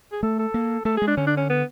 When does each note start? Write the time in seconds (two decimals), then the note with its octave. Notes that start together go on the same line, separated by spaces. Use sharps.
0.12 G#4
0.23 A3 A4
0.39 A4
0.54 A#3
0.85 A3 A4
0.97 G#4
1.02 G#3
1.07 D4
1.17 D3 C#4
1.27 D4
1.37 C#4
1.50 B3